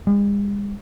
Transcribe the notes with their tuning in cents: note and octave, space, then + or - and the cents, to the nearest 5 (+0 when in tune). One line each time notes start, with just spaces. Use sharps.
G#3 -45